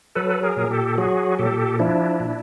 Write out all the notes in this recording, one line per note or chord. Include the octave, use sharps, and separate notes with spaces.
F#3 A4 B4
G#4 A#4
A#2
G4 A4
F#3 F#4 G#4
A#2 G4 A4
F3 D4 E4
A#2